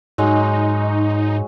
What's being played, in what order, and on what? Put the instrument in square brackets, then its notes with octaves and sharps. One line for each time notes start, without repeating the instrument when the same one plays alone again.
[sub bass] G#2 [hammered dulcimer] F#3 G#3 [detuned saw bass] D#4